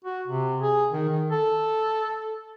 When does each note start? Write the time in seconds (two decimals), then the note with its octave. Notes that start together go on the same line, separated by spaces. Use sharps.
0.04 F#4
0.28 C3
0.60 G#4
0.92 D#3
1.09 D#3
1.31 A4